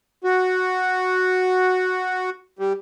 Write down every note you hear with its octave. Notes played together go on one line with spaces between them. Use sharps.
F#4
G3